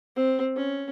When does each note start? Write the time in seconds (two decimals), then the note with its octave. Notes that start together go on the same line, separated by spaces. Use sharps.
0.16 C4
0.57 C#4